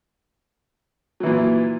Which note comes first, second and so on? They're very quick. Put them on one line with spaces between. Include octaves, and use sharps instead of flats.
F#3 E3 A#2